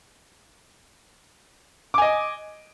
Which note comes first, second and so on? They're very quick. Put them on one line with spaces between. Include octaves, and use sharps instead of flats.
D6 G#5 D#5